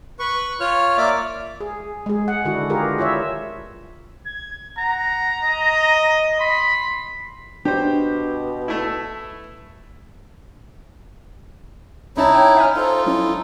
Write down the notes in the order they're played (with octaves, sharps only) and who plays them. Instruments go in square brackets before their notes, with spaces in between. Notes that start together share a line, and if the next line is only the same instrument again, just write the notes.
[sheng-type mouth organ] B4 C#6
F4 C#5 F6
A#3 D5 E5 D6
[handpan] G#4
G#3 G#4
F#5
D3 D#3 D4 E4 F#4
F4 G4 G#4 A#4 B4
E4 F4 C#5 E5
[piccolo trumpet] G#6
[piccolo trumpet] F#5 [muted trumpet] A#5
[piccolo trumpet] D#5
[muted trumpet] B5 [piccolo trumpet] C6
[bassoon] B2 [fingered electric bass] D4 [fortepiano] G4 C5
[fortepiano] A3 E4
[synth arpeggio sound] C2 C#4 A5 [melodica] D#4 E4 [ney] C#5
[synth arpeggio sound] G5
E5 G#5 F6
[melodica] D#4 F4 A4 [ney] C5
[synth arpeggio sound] F#3 C#4 [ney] E4